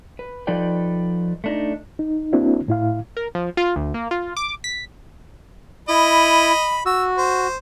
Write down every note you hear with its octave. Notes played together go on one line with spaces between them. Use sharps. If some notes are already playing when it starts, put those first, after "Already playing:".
B4
F3 D#4 A4 B4 D5 G5
A3 D4 D#4
D#4
A#3 C4 D4 E4 F#4
A2 E4 F5
A#4
F3
F4
D2
A#3
F4
D6
B6
E4 D#5 B5
F#4 E6
C5